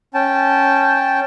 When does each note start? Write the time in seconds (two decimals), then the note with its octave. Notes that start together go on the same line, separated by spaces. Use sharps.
0.14 C#4 G5 A5